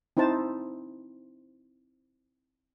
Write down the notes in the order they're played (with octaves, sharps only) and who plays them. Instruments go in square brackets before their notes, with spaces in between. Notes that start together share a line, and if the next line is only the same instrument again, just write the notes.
[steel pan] C4 D#4 E4 C5 A5